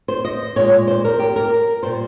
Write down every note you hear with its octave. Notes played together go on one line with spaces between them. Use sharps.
C5
D#5
A#2 G#3 C#5
C5
A#4
G4
A#4
A#2 G3 C5